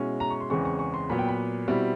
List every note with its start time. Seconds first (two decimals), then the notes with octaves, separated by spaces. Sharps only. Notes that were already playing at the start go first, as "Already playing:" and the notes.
Already playing: B2 G#3 C#4 E4
0.20 A#5
0.30 C#6
0.41 C6
0.50 E2 C#3 E3 G#3 C4 C#6
0.65 C#6
0.79 C#6
0.94 C6
1.10 A#2 F#3 B3 B5
1.19 G5
1.29 B5
1.68 B2 G3 C4 E4